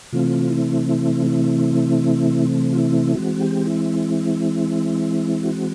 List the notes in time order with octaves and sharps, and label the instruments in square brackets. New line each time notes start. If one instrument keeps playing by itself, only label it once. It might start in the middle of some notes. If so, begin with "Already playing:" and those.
[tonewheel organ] C3 E3 A3 C4 F4
E4
E4
E4
F4
E4
E3 G#3 C4 F#4
G4
E4
F#4